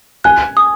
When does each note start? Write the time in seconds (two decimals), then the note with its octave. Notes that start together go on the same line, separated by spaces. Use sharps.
0.24 G#5 F#6
0.57 D#6